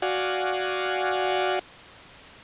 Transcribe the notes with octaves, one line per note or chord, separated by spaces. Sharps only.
F#4 D5 F5 F#5 G#5